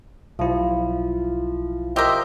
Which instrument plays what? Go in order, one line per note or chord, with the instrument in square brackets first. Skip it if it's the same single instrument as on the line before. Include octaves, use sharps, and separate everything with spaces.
[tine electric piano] B1 E4 [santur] F3
[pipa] G4 A#4 [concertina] C5 D#5 E5